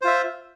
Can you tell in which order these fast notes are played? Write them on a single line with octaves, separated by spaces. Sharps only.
C5 F4 E5